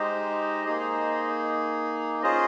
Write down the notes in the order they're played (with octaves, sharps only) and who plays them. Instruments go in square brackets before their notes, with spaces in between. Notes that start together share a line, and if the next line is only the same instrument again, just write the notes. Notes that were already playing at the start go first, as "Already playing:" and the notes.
Already playing: [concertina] G#3 D#4 G4 C5 D#5
A#3 D#4 G#4
C#4 F4 G#4 C5 D#5